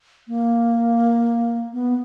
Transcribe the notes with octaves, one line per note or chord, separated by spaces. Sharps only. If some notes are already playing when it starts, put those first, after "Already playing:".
A#3
B3